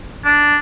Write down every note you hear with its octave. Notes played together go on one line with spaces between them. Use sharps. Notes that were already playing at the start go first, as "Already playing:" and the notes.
D4